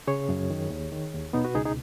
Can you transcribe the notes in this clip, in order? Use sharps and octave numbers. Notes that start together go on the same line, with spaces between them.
C#3 G#4 C#5
F#2
D#3
D#2
D#3
D#2
B2 B3 D#4
F#4 B4
C#2 D#4 G#4
D#4 G#4